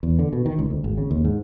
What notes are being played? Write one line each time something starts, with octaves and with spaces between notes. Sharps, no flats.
E2
D3
B2
D#3
C#2
D2
G#1
C#3
D#2
G#2